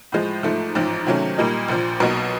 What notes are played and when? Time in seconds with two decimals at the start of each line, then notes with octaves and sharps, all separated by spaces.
0.12 A2 F3 G#3
0.43 G#2 F3 A3
0.75 A1 G#2 F3
1.07 C3 D#3 F#3 A3 C#4
1.38 A#2 G3 A#3 D#4
1.68 A#1 A#2 F3
2.00 B1 B2 F#3 A#3 D#4